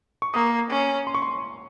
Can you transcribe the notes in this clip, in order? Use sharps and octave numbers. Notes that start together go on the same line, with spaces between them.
C#6
A#3 D#6
C#4
C6
C#6
C6